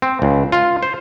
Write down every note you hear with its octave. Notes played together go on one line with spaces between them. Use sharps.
C4
C#2
F4
C5